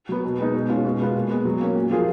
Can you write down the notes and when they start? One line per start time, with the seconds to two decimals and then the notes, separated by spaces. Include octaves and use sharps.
0.09 F#3 B3
0.24 B2
0.39 G#3 B3 D#4
0.54 B2
0.69 G#3 C#4 F4
0.85 B2
1.00 G#3 B3 F4 B4
1.15 A#2
1.30 G#3 B3
1.45 F#3
1.60 A#3 C#4
1.76 A#2
1.91 F3 A#3 F4 G#4